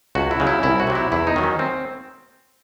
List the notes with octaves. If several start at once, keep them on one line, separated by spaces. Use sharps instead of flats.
C#2 F#4
E4
C#3 F#3
E4
C2 E4
F#4
C3 F#3
E4
E2 E4
D#4
D#3 F#3
C#4
C4